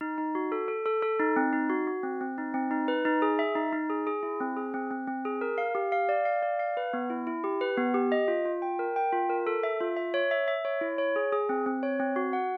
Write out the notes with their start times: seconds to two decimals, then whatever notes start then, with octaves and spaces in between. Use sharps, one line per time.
0.01 D#4
0.18 D#4
0.35 F#4
0.52 A4
0.68 A4
0.86 A4
1.02 A4
1.20 D#4
1.36 C4
1.53 D#4
1.70 F#4
1.87 F#4
2.03 C4
2.21 C4
2.38 D#4
2.54 C4
2.71 D#4
2.88 B4
3.05 D#4
3.22 G#4
3.39 E5
3.55 D#4
3.73 D#4
3.90 G#4
4.07 G#4
4.23 E4
4.40 C4
4.57 G#4
4.74 C4
4.91 C4
5.08 C4
5.25 G#4
5.41 A#4
5.58 F5
5.75 G4
5.92 F5
6.09 D5
6.25 F5
6.43 D5
6.59 F5
6.77 B4
6.93 B3
7.10 E4
7.27 E4
7.44 G4
7.61 B4
7.77 B3
7.94 G4
8.12 D#5
8.28 F4
8.45 F4
8.62 G5
8.79 A#4
8.96 G5
9.13 F4
9.30 A#4
9.47 A4
9.63 E5
9.81 F4
9.97 E5
10.14 C#5
10.31 E5
10.48 E5
10.65 C#5
10.81 E4
10.98 C#5
11.16 G#4
11.33 G#4
11.49 C4
11.66 C4
11.83 C#5
12.00 C4
12.16 F#4
12.33 F#5